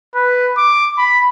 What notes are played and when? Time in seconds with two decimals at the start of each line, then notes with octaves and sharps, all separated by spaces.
0.15 B4
0.57 D6
0.98 B5